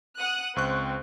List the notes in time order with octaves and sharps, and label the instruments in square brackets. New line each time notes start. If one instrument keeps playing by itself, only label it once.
[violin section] F#5 D#6 F#6
[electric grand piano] C#2 C#6 F#6 [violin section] C4